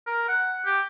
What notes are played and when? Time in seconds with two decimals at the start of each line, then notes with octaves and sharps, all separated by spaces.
0.07 A#4
0.28 F#5
0.65 G4